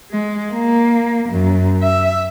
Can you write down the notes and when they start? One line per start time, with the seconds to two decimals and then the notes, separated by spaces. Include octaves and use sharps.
0.11 G#3
0.53 A#3
1.29 F#2
1.82 E5